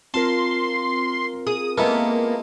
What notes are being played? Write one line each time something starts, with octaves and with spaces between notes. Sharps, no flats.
C4 F4 A#4 A5 C6
G#4 D#6
G#3 A#3 B3 E4 A4